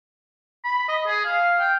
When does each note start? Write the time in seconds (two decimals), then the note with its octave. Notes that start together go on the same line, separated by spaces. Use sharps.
0.64 B5
0.89 D#5
1.07 G#4
1.25 F5
1.59 G5